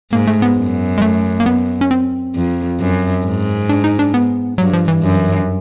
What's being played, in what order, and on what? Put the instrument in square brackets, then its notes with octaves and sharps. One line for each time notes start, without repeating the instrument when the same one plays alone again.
[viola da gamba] G#2 [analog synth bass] A#3
[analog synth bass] A3
B3
[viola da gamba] F#2
[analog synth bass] G#3
A3
A#3
B3
C#4
C4
[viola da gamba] F2
F#2
G#2
[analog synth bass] D4
D#4
D4
B3
[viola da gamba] G2 [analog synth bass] F#3
[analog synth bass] F3
E3
[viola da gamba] F#2